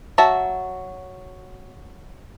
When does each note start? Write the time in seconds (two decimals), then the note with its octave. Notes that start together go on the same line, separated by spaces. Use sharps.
0.18 F#3 F#4 E5 A5